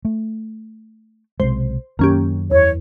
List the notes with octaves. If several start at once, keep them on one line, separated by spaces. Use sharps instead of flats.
A3
B1 C3 G#3 C5
F#2 D#3 F#3 A#3 C#4 G4
E2 C#5